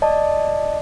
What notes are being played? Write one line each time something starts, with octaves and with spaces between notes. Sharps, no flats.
D5 D#5 A5